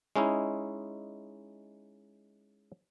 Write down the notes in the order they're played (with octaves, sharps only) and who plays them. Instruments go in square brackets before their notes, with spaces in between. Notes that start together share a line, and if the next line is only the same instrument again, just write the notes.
[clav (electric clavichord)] G#3 C#4 D#4 E4